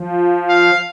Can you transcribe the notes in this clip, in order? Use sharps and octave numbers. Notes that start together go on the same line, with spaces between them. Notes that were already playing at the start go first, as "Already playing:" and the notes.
Already playing: F3
F5